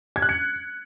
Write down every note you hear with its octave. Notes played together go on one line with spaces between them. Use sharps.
G#6
F#6
C#7